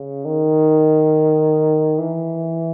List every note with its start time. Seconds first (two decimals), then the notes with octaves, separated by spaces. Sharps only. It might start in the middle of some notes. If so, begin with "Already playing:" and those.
Already playing: C#3
0.25 D#3
1.99 E3